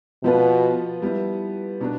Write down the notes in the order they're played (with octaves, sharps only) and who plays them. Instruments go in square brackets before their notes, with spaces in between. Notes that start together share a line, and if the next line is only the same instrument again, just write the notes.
[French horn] B2 [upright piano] F3 B3 F4 B4
[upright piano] G3 B3 E4
B2 B3 D4